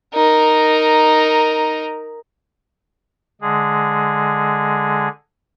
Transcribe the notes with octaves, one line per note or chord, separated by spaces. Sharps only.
D#4 A#4
D3 G#3 G#4